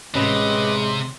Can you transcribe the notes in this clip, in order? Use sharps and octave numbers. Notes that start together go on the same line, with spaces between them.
A1 C3 G#3 B4 D#5